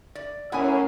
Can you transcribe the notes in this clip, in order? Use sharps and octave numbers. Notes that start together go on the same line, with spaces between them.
D5
A2 A#3 C#4 E4 F#5 G#5 B5 D#6